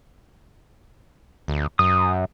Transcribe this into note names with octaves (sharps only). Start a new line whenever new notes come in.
D2
F#2 D#6